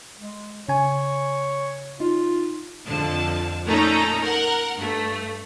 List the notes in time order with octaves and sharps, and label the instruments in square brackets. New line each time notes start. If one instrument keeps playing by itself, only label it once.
[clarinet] G#3
[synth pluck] C#3 G#5 [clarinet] C#5
[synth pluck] D#4 [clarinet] F4
[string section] F2 D3 F3 A5
A#2 A3 C#4 D#4 A4 A#5
A#4 F#5
G2 A3